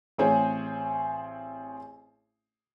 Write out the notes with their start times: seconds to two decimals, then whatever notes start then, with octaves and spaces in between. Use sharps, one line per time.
0.18 A1 C4 G#4 C5 C#5 G#5